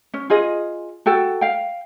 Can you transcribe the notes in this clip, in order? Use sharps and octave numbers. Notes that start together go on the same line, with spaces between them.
C#4
F4 G#4 D#5
F#4 A4 G5
F5 G5